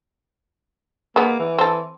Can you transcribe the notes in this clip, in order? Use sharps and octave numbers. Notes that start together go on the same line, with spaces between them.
G#3 A#3 B3
E3
C4 A4